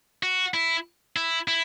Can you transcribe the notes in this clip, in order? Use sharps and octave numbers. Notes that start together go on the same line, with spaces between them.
F#4
E4
E4
E4